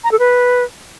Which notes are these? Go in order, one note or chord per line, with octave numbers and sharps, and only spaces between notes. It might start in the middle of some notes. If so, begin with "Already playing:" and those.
A#5
A4
B4